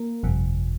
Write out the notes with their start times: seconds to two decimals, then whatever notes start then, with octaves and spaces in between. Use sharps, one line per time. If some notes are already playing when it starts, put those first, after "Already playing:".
Already playing: A#3
0.23 G1 F2 C3